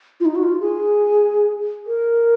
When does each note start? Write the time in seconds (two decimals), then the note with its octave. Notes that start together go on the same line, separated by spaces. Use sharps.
0.20 F4
0.25 D#4
0.35 F#4
0.43 F4
0.60 G#4
1.87 A#4